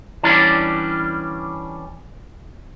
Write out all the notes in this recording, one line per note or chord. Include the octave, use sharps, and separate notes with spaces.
E3 G3 C#4 D4